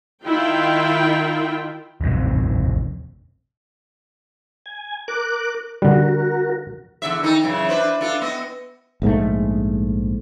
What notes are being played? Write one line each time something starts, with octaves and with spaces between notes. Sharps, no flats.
D#3 E4 F4 G5
D#1 A1 F2 C3
G#5
A#4 D6 F#6
D3 G3 F#4 A#4
E2 D3 E5
D#3 D#4 A4
F#2 C#3 E3
D4 B4 C5
D4 F4 A4
B3 D#5
A#1 G#2 D3 A3